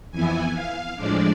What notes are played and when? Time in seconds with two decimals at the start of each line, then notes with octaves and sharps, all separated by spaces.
0.11 F2 E3 B3 E4 G#5
0.54 F5
0.96 A2 F3 G#3 D4 D5